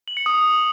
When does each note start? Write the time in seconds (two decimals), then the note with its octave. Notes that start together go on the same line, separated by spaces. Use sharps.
0.08 F#7
0.17 C#7
0.26 D#6